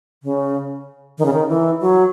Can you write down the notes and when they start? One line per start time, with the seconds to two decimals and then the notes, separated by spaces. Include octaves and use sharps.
0.23 C#3
1.18 D#3
1.25 C#3
1.33 D#3
1.49 E3
1.81 F#3